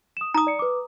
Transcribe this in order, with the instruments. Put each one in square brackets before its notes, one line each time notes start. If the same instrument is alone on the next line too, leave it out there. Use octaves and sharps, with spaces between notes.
[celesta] D#6 E7
[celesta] D#4 [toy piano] A#5 D#6
[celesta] D5 C#7
B4 D6